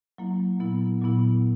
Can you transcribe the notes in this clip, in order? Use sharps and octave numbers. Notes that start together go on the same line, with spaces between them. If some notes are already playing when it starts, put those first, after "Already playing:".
F#3 A#3 E4
A#2 F#3 B3 E4
A#2 F#3 B3 E4